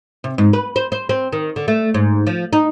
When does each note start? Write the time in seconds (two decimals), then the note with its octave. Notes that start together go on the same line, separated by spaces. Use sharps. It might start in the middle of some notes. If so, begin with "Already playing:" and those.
0.24 C3
0.38 G#2
0.53 B4
0.76 C5
0.92 C5
1.09 C4
1.33 D#3
1.56 D3
1.68 A3
1.94 G#2
2.27 F3
2.53 D#4